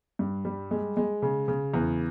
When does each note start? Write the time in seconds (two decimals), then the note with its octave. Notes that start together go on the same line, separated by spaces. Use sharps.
0.19 G2
0.45 G3
0.71 G#3
0.97 G#3
1.22 C#3
1.48 C#3
1.74 E2